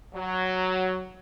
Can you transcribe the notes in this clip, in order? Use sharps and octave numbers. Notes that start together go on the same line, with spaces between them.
F#3